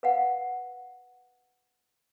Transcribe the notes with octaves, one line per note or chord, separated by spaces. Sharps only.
B4 F5 F#5